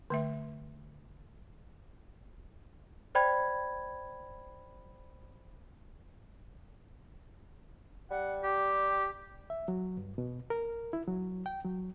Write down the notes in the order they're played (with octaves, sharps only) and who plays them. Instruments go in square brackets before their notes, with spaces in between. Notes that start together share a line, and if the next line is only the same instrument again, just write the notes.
[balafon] D3 A3 E5
[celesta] C5 D5 G5 B5 G#6
[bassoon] G3 [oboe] F#5
[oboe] G4
[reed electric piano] E5
F#3
G2
B2
A#4
E4
F#3
G5
F#3